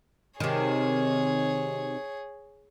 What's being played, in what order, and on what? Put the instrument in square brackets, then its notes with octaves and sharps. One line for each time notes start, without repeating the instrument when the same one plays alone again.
[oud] C3 D#3 [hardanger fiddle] G#4 C#5